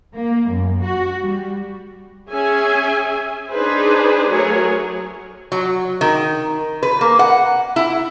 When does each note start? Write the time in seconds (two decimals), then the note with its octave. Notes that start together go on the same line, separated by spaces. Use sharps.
0.15 A#3
0.50 F#2
0.83 F#4
1.20 G3
2.30 C#4 G#4 E5 G#5
3.50 D4 D#4 G#4 B4 C5
4.28 F#3 A3 G#4 A#4 C#5
5.52 F#3
6.01 D#3
6.83 B4
7.01 A#3
7.19 F#5
7.76 E4